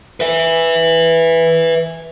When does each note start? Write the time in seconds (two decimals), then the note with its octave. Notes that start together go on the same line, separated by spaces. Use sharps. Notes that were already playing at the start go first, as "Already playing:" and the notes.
0.20 B4 E5